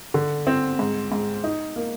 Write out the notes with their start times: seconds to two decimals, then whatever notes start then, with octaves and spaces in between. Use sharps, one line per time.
0.14 D3
0.47 C4
0.79 G#2
1.12 G#2
1.44 D#4
1.76 A#3